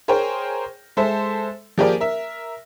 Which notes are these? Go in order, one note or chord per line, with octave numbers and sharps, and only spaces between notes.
G#4 A#4 C5 C#5 G5
G#3 A4 C5 E5
F3 A#3 G4 G#4 A#4 D5
A#4 E5